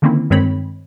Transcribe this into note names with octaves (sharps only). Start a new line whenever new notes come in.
D3 D#3 A#3 C4 C#4 E4
G2 D#3 G#3 C4 C#5 B5